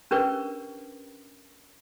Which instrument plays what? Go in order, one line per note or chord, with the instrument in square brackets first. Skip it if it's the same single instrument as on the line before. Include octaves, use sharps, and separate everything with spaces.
[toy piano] C#4 D4 G4 A#4 B4 D5